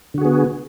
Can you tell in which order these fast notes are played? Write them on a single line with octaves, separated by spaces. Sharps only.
D3 F#4 G#4 B3